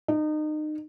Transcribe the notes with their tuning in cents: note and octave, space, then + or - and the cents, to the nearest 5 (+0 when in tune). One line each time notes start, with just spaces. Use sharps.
D#4 -30